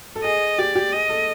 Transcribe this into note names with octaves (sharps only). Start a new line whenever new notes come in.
A4
G#4 D#5
G4 D5
G4
G#4 D#5
A4